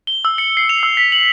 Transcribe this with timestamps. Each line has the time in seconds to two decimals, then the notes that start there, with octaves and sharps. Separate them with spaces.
0.07 G7
0.25 E6
0.38 C#7
0.57 C7
0.69 F7
0.83 E6
0.97 B6
1.12 F#7